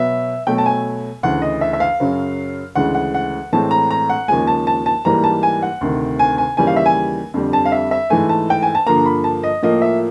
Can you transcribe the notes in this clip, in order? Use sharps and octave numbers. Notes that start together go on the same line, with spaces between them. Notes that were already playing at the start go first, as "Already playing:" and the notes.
Already playing: B2 F#3 B3 E5
B2 F#3 A3 G5
A5
G#5
D2 C#3 E3 F#5
D#5
E5
E5
F5
F#2 C#3 F#3
D2 C#3 E3 G#3 F#5
F#5
F#5
A2 E3 G#3 C4 A5
A#5
A#5
F#5
D#2 C#3 F3 G#3 G#5
A5
A5
A5
G#2 E3 G3 A#3 A#5
A5
G#5
F#5
D2 C3 D#3
G#5
G#5
D#2 C#3 E3 G3 G#5
F5
E5
G#5
F2 D3 G3
A5
F5
E5
E5
G#2 E3 A3 G#5
A5
G5
G#5
A5
G2 D3 F3 A#3 A#5
B5
A5
D#5
A2 F3 A#3 D#5
E5